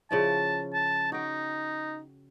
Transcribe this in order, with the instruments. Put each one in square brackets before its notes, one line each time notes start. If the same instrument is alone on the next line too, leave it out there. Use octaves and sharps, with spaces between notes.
[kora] C#3 F3 E4 [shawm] A5
[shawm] A5
[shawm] D#4 [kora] F#4 G5